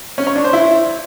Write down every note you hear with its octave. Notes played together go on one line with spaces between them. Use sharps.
C#4
C#5
D4
C5
E4